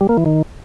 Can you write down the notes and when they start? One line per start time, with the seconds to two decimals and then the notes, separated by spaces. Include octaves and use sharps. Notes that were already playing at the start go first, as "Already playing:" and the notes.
0.01 G3
0.09 A#3
0.17 E3
0.26 D#3